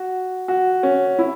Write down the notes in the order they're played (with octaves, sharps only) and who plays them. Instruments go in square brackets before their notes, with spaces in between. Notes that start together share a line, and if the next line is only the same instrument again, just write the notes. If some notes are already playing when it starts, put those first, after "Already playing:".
Already playing: [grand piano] F#4
F#4
C#4
E4